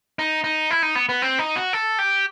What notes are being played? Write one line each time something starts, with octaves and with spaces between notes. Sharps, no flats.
D#4
D#4
E4
D#4
B3
B3
C4
D#4
F#4
A4
G4